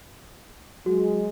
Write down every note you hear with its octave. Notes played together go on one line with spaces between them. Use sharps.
F#3 G#3 F#4